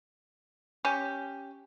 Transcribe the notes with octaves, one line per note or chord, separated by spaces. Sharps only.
C#4 G4